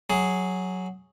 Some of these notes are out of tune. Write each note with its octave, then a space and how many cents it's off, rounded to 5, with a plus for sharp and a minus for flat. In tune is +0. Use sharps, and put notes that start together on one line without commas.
F#3 +0 G#4 +0